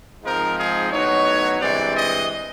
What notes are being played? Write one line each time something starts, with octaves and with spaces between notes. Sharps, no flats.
G#2 F3 G#3 C4 D#4 A#4
G#4
A2 F#3 B3 D#4 C#5
G2 E3 G#3 C4 D5
D#5